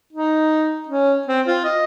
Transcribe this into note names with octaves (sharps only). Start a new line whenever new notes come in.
D#4
C#4
C4
F4
D#5